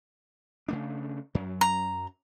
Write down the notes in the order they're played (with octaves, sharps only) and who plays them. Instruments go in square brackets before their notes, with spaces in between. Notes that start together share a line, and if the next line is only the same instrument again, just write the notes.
[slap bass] C#3 A3 D4
F#2 F#3
[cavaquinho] A#5